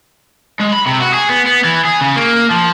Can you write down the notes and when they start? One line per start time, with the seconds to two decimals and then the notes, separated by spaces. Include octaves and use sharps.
0.61 G#3
0.73 B5
0.87 C3
1.01 F#4
1.14 G#4
1.30 B3
1.47 B3
1.65 E3
1.85 G#4
2.01 C#3
2.16 A#3
2.50 F3